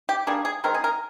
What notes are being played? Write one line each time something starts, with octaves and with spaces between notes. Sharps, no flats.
G4
G3 A#3 D4 G#4
G#4
D#3 G#3 C4 A#4
G#4
A#4